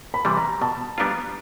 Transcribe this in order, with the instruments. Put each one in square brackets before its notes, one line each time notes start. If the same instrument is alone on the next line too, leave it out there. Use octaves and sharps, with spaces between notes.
[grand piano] B5
[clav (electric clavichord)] C3 E3 G3
[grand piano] A#5
[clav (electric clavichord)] B2 [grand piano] A5
[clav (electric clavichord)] G3 B3 D4 F4 [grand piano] A#5